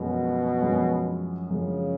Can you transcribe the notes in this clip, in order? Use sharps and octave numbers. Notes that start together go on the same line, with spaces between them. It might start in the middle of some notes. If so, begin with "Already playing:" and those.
Already playing: F#2 B2 F3 G#3
F#2 F3 G#3
F#2 C#3 F3 G#3